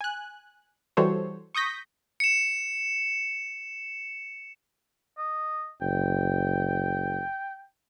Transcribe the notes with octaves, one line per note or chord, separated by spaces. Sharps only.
G#5 F#6
E3 G3 F#4 A4 C5 C#5
C#6 D#6 G6 A#6 B6
C#7 E7
D#5
F#1 G5